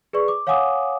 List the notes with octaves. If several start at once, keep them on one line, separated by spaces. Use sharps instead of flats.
G#4 B4 D5 C#6
D6
C#5 F5 F#5 G#5 D6 D#6